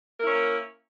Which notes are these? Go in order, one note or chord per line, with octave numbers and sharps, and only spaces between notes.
A#3 C#4 E4 A#4